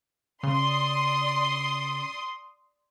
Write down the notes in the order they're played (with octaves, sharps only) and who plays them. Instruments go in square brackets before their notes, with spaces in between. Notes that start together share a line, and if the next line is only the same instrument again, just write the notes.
[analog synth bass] C#3 [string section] D5 C6 D#6